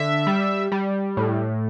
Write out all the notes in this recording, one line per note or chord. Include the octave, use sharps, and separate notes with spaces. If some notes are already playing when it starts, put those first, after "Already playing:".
Already playing: D3 E5
G3
G3
A2